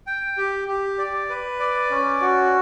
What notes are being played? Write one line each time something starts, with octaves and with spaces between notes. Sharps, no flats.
G5
G4
G4
D5
B4
D5
C#4
F#4